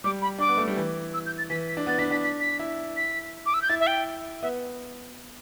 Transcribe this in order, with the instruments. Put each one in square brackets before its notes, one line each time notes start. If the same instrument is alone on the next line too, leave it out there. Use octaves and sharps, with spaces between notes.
[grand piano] G3 [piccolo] D6
[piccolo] B5
[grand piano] D4 [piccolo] D6
[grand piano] B3
A3
G3
E3
[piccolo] E6
G6
A6
[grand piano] E3 [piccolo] B6
[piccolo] B6
[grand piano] D4
[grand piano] B3 [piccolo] A6
[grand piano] D4 [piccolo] B6
[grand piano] D4 [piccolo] B6
[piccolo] B6
B6
[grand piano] E4
[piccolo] B6
D6
E6
G6
[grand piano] E4 [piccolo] A6
[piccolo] E5
G5
[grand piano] B3 [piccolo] E5